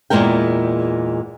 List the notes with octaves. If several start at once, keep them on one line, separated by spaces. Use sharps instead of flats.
E2 G2 A#2 G#3 A#4 G5